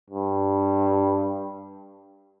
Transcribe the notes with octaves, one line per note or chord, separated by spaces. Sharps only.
G2